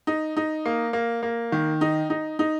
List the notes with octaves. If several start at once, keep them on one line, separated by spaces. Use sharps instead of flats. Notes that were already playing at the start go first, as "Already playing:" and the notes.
D#4
D#4
A#3
A#3
A#3
D#3
D#4
D#4
D#4